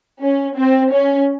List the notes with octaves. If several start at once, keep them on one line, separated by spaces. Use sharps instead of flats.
C#4
C4
C#4